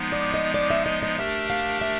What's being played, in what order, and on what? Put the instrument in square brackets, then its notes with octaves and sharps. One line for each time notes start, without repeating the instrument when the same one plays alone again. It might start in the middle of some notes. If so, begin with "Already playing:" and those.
Already playing: [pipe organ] F3 G#3 B3 D#4
[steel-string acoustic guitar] D5
D#5
D5
E5
D#5
D#5
[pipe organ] A3 D4 G4 A#4 [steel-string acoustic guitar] E5
[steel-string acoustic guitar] F5
E5